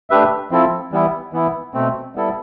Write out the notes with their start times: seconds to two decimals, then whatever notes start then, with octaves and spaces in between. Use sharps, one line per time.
0.10 A3 D4 G4 B4 E5
0.51 F3 C4 E4 A4
0.92 E3 G3 B3 E4
1.33 E3 B3 E4
1.74 B2 A3 C4
2.15 G3 B3 E4 A4